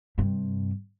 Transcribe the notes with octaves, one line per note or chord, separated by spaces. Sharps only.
G2 C3